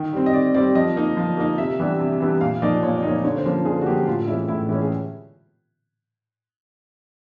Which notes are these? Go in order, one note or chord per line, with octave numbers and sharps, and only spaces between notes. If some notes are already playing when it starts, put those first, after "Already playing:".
Already playing: D#3
G3 C4
D#5
D#3 D5
G3 C4 D5
F3 D#5
A#3 D#4
F3
A#3 D#4
C3 E5
E3 G3 B3 D4
C3
E3 G3 B3 D4
A#2 F5
F3 A#3 D#4 D5
A#2 C#5
D5
F3 A#3 D#4 C#5
D3 C#5
C5
F3 A#3 C#4
D3 G#4
F#4
F3 A#3 C#4 G4
A2 F4
E3 G#3 C#4 E4
A2 E4
E3 G#3 C#4 E4
G#4